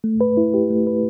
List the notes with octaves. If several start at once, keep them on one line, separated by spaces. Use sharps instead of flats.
A3
B4
E4
G4
A3
B4